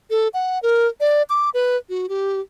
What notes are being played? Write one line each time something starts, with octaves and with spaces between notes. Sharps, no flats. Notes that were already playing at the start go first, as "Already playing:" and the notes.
A4
F#5
A#4
D5
D6
B4
F#4
G4